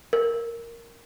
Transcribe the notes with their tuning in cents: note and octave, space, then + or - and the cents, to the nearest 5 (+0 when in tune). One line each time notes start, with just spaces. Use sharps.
A#4 -5